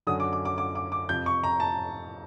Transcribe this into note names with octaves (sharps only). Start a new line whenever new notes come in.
F#2 D3 F#3 D#6
D6
D6
D6
D6
D6
D6
F2 C3 F3 G6
C#6
A#5
A5